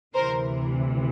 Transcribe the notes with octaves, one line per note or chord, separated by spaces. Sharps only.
D2 C3 E3 A#4 C5